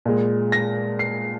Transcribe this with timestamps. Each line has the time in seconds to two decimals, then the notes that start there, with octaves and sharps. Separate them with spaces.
0.06 A#2 G#3
0.52 A#6
0.99 C7